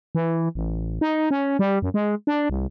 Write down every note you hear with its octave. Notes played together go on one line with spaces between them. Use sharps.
E3
A1
D#4
C#4
G3
F#2
G#3
D4
C2